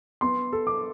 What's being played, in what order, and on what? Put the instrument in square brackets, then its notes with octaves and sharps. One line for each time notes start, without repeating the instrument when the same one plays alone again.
[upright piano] B3 [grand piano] C6
[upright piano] A4
[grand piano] D6